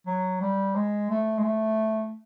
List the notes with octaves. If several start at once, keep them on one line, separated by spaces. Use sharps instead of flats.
F#3
G3
G#3
A3
G#3
A3